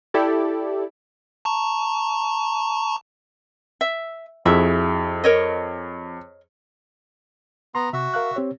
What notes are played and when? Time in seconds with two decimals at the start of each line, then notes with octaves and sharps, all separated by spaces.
0.14 E4 G4 A4 D5
1.45 A5 A#5 C#6
3.81 E5
4.45 F2 E4 F#4 G#4 E5
5.24 A#4 C#5 D#5
7.75 B3 A#5 C6
7.93 C3 F#4 E5
8.14 A#4 F5 F#6
8.36 C4 G4 C#5